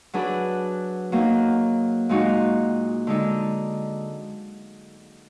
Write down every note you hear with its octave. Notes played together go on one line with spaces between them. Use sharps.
F#3 D4 G#4 B4
F#3 A#3 D#4
A#2 G#3 D#4 F#4
D3 G#3 D#4